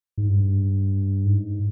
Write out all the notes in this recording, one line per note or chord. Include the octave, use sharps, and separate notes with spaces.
G#2
G2
G#2